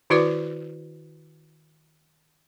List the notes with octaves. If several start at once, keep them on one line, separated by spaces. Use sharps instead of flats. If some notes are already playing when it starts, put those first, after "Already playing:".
D#3 E4 F#4 B4 D5 D6